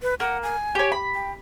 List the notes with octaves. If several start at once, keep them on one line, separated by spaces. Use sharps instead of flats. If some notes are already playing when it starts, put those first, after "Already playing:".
B4
A#3 F#5
G#5
G4 C#5
B5
G5